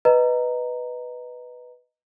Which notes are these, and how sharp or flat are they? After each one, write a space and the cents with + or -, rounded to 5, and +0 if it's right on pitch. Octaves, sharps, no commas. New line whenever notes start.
B4 +0 D#5 +0 A#5 -10